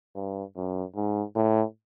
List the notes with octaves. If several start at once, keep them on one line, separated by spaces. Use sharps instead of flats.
G2
F#2
G#2
A2